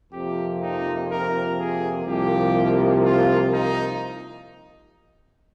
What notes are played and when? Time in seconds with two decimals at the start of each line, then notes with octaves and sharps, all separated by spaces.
0.11 F2 C3 F3 A#3 G4
0.61 D#4
1.09 A#4
1.58 G#4
2.06 C2 C3 F3 A#3 G4
3.03 F4
3.52 D#4